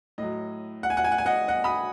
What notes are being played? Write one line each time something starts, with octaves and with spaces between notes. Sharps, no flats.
A2 F#3 D#5
F#5
G#5
F#5
G#5
F#5
G#5
D#5 F#5
D#5 F#5
B5 D#6